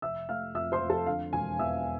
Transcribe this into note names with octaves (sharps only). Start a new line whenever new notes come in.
F1 E5 E6
A3 F5 F6
F2 E5 E6
C5 C6
F2
A4 A5
D3 F5
E1 G#5
E2 E5 E6